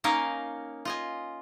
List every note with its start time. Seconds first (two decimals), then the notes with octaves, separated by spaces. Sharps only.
0.04 A#3 C#4 D#4 A#4 D#5 F5
0.85 F4 D#5 G#5